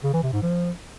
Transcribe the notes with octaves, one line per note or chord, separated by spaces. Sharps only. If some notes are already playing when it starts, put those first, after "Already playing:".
C#3
E3
C3
G#2
F3